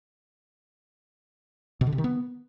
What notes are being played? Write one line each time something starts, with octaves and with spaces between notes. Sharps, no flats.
B2
D3
C3
D#3
B3